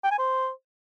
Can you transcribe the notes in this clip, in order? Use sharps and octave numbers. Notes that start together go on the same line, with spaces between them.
G5
G#5
C5